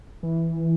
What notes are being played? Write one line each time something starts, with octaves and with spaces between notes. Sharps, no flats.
E3